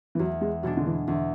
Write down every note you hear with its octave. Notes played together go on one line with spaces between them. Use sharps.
E3
E2 F#3
G#3
B2 F#3 G#3 B3 D4
D3
E3
E2 D3